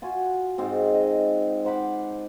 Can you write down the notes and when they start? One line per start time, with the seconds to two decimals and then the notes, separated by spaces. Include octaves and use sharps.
0.02 F4 F#4 G#5
0.58 G#2 C4
0.94 D#5
1.65 C5 F#5 B5 D6